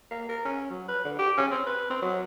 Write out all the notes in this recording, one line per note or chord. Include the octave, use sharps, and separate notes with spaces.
A#3
A#4
C#4
F#3
B4
D3
G4
C#4
C4
B4
C4
F#3